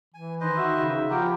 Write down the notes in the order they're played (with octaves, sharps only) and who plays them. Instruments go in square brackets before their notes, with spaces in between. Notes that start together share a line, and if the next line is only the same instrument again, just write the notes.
[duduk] E3 [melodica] G#5
[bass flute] D#3 [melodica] B4 C5 D#5
[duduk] F#4 [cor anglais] E5
[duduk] C#3
[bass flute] F3 [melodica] B3 E4 A#4 [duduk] F4 [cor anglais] G4